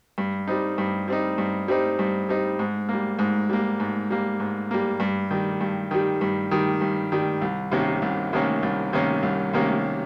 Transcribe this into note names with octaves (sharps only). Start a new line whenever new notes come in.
G2
G3 C4 D#4
G2
G3 C4 D#4
G2
G3 C4 D#4
G2
G3 C4 D#4
G#2
G3 A#3
G#2
G3 A#3
G#2
G3 A#3
G#2
G3 A#3
G2
D#3 G3
G2
D#3 G3
G2
D#3 G3
G2
D#3 G3
C2
C3 D#3 A#3 C#4
C2
C3 D#3 A#3 C#4
C2
C3 D#3 A#3 C#4
C2
C3 D#3 A#3 C#4